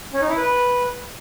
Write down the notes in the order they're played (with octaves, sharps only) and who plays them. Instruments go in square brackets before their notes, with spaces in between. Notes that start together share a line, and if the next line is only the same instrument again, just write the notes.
[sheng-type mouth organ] C#4
D#4
E4
B4